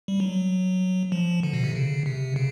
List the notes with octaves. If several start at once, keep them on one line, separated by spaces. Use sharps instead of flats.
G3
F#3
F3
D3
B2
C3
C#3
C3
C#3